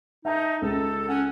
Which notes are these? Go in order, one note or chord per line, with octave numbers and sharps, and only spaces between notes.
D#4 E5 A5 G6
C#2 A4
C#4 F#5